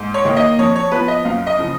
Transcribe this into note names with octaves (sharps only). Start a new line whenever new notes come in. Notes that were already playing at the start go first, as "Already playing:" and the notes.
Already playing: G#2
C#5
D#3 A#3
D#5
F2 C#5
C#5
F3 B3 B4
D#5
F#2 F5
D#5
C#3 F3